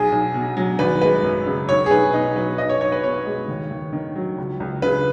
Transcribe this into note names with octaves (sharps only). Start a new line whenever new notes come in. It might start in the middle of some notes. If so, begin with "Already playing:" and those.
Already playing: B1 G#4
B1
B2
F#3
G#1 B4
G#3 B4
F#2
C#3
B1 C#5
G#4
B1 B4
B2 D#4
F#3 B4
B1 D#5
C#5
B1 C#5
B4
B2 C#5
G#3
D#2
D#2
D#3
F#3
C#2
C#2
C#3 B4